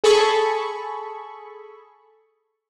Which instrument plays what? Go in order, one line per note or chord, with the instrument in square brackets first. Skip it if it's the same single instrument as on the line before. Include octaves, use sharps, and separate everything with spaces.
[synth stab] G#4 A4 B5 C#6